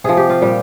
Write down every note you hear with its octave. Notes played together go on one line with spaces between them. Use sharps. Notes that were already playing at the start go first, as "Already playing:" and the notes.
C3 F3 G#4
G4
F4
A#2 G3 G4